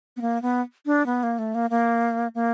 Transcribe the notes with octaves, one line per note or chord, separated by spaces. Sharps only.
B3
A#3
B3
D4
B3
A#3
A3
A#3
A#3
A#3